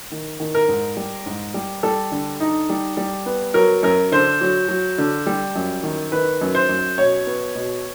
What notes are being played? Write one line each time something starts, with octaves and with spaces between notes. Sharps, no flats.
D#3
D#3
A#4
G#2
G3
G#2
G3
G3 A4
D3
D#4
G3
G3
B3
F#3 A#4
F#2 A#4
D3 C5
F#3
F#3
D3
G3
F#2
D#3
D#3 B4
F#2
C5
F#2
B2 C#5
B3
B2